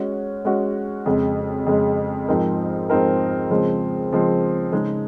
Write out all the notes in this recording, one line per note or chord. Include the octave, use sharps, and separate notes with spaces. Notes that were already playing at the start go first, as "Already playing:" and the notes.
Already playing: G#3 C#4 F#4
G#3 C#4 F#4
F2 C#3 G#3
F2 C#3 G#3
G#2 F3 C4 D#4 A#4
G#2 F3 C4 D#4 A#4
C#3 F3 G#3 C4
C#3 F3 G#3 C4
C#3 G#3 D#4